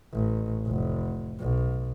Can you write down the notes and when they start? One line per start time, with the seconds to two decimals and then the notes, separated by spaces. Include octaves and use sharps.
0.13 A1
0.67 F1
1.40 B1